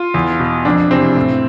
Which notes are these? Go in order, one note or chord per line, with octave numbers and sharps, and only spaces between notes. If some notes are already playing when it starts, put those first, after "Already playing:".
Already playing: F4
E2
B2
F2 D4
C3 E3 C4
A2